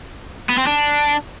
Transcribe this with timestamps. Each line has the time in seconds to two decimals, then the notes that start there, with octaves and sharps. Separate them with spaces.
0.50 B3
0.58 C4
0.67 D4